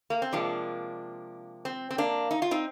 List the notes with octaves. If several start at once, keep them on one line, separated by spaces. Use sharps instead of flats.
A#3
C4
C3 F3 G#3 A#3 D4
C4
C4
A#3 D4
D#4
F4
C4 D#4